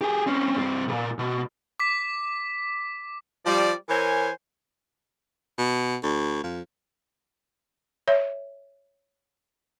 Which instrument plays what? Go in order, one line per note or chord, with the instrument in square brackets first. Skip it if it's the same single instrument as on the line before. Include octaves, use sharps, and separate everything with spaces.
[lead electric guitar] G4 G#4
C4 C#4
G2 C4
B1 A#2
B2
[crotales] D6 B6
[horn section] F3 G3 D5
E3 A#4 C5 C#5 G#5
[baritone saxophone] B2
D2
F2
[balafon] C#5 E5